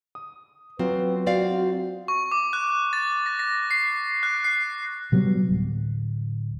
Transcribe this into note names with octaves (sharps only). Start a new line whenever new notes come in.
D#6
F#3 C4 F4 B4
C4 F#4 D5 F5
C#6
D6
F#6
A6
A#6
A#6
C7
F#6
C7
C3 F#3 G3 B3
D1